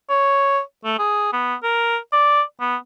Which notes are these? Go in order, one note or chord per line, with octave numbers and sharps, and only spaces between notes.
C#5
A3
G#4
B3
A#4
D5
B3